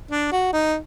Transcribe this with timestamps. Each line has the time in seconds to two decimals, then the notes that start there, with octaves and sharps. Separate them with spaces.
0.11 D4
0.32 F#4
0.53 D#4